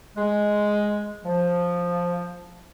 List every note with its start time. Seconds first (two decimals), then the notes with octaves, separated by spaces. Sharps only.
0.17 G#3
1.24 F3